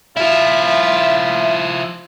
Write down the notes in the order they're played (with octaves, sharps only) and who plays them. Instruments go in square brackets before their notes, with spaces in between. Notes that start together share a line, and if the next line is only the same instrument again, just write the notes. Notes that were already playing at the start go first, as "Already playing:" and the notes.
[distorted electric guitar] F3 E4 [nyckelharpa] F4 [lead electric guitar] E5